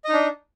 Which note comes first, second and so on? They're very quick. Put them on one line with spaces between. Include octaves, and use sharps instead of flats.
D#5 D#4 D4